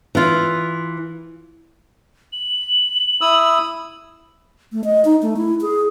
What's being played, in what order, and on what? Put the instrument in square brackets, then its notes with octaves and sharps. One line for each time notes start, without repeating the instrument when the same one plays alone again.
[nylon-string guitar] E3 F4
[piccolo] F#7
[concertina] E4 D#6 E6
[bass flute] A3
D#5
D#4
A3
E4
G#4